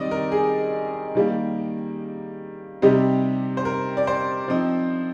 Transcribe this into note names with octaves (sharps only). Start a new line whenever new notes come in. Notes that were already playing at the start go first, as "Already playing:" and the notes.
Already playing: D#3 G3 C4 D#4 D5 D#5
A#4
G#4
D#3 G3 A#3
C3 G3 C4 D#4 G4
C5
A#4
D5
C5
F3 C4 D#4